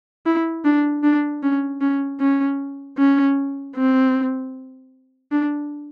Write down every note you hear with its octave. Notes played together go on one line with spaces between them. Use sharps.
E4
D4
D4
C#4
C#4
C#4
C#4
C4
D4